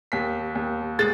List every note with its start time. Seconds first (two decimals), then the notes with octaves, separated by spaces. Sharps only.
0.12 D#2 B6
0.55 D#2
0.99 G#3 A6